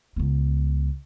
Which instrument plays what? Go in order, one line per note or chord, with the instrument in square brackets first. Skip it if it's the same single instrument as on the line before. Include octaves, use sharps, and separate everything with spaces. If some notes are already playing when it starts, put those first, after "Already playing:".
[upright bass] C#2 B3